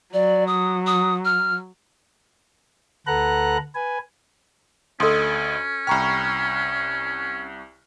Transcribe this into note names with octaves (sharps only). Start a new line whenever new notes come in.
F#3 D5
D#6
D#6
F6
D2 A4 B4 F#5 A#5 F#6
B4 G#5
D2 C#4 A4 D#5 C6 D#6 E6
C2 G5 A#5 B5 C#6 F6